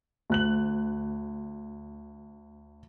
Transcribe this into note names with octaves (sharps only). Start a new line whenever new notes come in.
D2 F#6 F#7